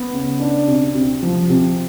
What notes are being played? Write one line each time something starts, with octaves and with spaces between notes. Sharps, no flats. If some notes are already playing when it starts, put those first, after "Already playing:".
Already playing: B3
C#3
D4
C3
C3
F3
C3